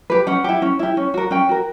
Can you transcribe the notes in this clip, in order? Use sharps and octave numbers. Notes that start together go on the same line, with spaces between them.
G4 B4
C#4 F#5
E4 G4
C#4
E4 G4
C#4
F#4 A#4
C#4 G5
F#4 A#4